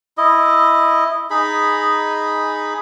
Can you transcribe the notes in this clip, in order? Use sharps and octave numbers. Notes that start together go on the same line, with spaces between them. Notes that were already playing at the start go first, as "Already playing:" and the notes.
E4 D#5
D#4 G#4 B5